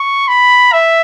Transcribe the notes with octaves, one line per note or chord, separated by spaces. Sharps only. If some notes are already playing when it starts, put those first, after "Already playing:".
Already playing: C#6
B5
E5